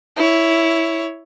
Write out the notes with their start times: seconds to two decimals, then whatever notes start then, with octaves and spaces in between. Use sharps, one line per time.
0.17 E4 C#5